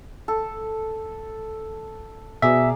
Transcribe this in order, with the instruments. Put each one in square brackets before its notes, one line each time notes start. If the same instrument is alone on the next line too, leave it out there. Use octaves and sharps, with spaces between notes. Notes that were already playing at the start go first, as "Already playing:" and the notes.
[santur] A4
[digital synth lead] B2 [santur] G#4 A#4 D5 [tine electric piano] E5